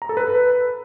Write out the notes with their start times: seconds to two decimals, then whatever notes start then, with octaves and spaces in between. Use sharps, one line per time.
0.02 A#5
0.09 A4
0.17 B4